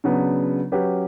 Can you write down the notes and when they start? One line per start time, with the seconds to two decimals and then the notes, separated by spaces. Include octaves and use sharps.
0.04 C#3 F#3 B3 D4
0.72 F#3 C#4 G4 B4